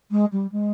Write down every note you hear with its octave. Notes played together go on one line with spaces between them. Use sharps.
G#3
G3
G#3